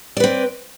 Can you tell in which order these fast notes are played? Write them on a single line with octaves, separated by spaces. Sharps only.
D5 B4 C4